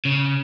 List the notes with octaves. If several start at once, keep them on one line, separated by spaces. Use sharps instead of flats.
C#3